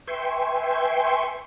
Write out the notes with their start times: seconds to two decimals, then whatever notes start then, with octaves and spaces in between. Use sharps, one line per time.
0.07 B4 E5 G5 G#5 C6 C#6